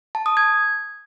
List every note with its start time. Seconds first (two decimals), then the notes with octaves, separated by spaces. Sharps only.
0.15 A5
0.26 D#6
0.37 G#6